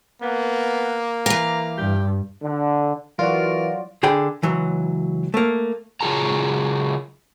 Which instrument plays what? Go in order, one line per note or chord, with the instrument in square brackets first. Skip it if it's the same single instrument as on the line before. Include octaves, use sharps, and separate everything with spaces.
[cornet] A#3 [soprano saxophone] B3
[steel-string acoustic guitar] E3 F5 [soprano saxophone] A#5
[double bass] G2 [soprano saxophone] G4
[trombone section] D3
[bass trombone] E3 [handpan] F#3 C5 D5 [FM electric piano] F4 F#4 [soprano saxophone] A#4
[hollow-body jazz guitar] D3 G#4 G5 B5
C#2 E3 F#3
A3 A#3
[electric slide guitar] C#3 F#3 F4 G#4 A5 A#5